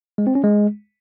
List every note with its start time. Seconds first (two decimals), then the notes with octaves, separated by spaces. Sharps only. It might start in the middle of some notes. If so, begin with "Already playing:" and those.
0.18 G#3
0.27 C4
0.35 C#4
0.44 G#3